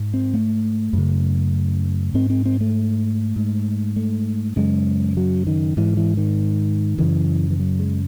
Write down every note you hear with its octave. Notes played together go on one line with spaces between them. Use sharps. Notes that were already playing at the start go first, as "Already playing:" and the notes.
Already playing: G#2
C4
A3
F#2 C#3
G#2 C4
C4
C4
A3
G#2
A3
F#2 C#3 G#3
F#3
D#3
G#2 E3
E3
D#3
F#2 C#3 E3
E3
F#3
G#3